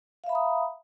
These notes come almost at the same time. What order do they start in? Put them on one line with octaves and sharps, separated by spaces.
F5 E5 B5 A#5 D#6